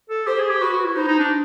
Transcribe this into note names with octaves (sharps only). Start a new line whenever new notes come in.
A4
G4 C5
G#4
G4
F#4 B4
F#4
E4
D#4 C5
D#4
D4